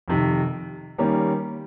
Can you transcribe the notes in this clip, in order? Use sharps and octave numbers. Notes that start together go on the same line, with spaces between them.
F2 C3 D#3
D#3 G3 A#3 C#4